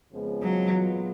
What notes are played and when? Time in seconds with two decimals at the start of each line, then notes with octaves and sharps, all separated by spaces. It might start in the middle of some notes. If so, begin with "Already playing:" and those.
0.12 F2 C#3 F3 G#3 B3
0.42 F#3
0.74 A#2 G#3 B3 F4